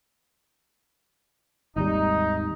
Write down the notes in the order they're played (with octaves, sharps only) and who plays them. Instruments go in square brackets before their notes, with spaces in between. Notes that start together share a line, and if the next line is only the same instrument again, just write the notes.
[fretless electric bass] G#1 D#2 G3 [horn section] D#4